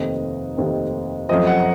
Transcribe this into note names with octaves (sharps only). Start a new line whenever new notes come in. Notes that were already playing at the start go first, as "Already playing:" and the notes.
Already playing: F1 D#2 D#3 A3 C4 D#5
F1 D#2 D#3 A3 C4
F#2 F3 A3 C4 D#5
F#5